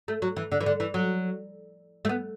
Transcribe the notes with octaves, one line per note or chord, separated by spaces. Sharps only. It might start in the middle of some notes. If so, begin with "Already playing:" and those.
A3
F#3
E3
D3
E3
D3
E3
F#3
A3
B3